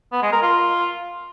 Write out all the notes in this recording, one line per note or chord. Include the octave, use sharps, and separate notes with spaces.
B3
G#3
A#4
F4